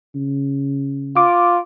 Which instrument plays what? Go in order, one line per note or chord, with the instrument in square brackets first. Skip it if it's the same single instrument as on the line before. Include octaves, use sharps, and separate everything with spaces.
[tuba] C#3
[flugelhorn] F4 [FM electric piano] D6